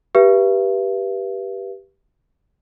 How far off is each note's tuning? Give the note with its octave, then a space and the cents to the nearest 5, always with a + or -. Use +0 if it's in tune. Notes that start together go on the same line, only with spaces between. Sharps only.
G4 +0 B4 -25 E5 +40